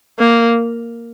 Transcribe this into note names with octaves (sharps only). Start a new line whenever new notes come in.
A#3